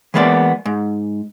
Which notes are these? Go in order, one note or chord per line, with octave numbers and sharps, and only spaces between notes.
E3 G#3 A#3 B3 C5 D5
G#2